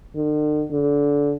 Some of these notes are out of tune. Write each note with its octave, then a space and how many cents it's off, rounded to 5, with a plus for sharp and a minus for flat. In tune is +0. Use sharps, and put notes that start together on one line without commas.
D3 +45
D3 -25